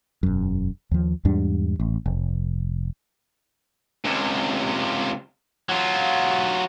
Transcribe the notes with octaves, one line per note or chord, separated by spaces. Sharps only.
E1 F#2
D#2 F3
E2 G#2 G3 D4
A1
F1
C#2 C3
F#3 F4